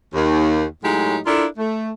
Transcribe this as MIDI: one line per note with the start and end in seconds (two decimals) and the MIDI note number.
0.14 0.63 39
0.83 1.17 45
0.83 1.17 54
0.83 1.17 56
0.83 1.17 63
0.83 1.17 67
1.26 1.45 62
1.26 1.45 64
1.26 1.45 65
1.26 1.45 69
1.26 1.45 70
1.57 1.91 57